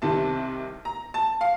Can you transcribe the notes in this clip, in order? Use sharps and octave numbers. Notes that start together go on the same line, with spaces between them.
C2 C3 D#3 A5
A#5
A5
F5